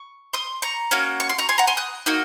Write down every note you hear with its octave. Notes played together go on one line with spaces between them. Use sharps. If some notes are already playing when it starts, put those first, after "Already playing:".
Already playing: C#6
C6 D#6
A#5 C#6
A#3 C#4 F#4
C#6
C6
A#5 C#6
G#5 C6
F#5 A#5
G#5 C6
D#6 F#6
A#3 D#4 F#4